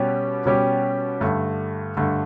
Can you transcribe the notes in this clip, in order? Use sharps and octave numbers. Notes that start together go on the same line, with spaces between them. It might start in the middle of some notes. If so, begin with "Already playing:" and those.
Already playing: B2 G3 C#4 G4
B2 G3 C#4 G4
G2 D3 A3
G2 D3 A3